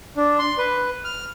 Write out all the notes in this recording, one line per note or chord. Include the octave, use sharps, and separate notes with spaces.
D4
C6
B4
F6